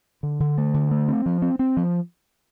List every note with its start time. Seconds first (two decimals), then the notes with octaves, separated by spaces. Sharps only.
0.23 D3
0.40 D3
0.58 A3
0.74 D3
0.91 A3
1.08 C4
1.26 F3
1.42 C4
1.59 C4
1.77 F3